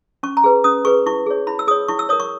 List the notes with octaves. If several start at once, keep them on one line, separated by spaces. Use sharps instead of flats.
C#4 C#6
A#5
G#4 B4
C#4 D#6
G#4 B4 C#6
E4 C#6
G#4 C#5
E4 B5
E6
G#4 C#5 D#6
E4 C#6
E6
A#4 C#5 D#6
C#6